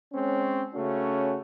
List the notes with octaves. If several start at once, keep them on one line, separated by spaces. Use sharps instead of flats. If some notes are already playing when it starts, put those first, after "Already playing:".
G#3 C4 C#4
C#3 A3 C#4 F#4